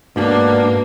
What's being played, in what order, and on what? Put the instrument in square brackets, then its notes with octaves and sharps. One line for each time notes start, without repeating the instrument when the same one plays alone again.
[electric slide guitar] G#2 [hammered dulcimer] B2 A5 [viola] A#3 [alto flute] D4